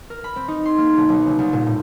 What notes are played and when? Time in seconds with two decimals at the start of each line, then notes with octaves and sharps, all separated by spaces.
0.10 A#4
0.24 B5
0.36 C4
0.48 D#4
0.66 C6
0.78 A#3
0.97 B1
1.09 B1
1.26 C#3
1.39 C2
1.53 A#2
1.67 A2